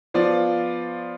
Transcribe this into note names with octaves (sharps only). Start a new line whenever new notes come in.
F3 B3 F4 D5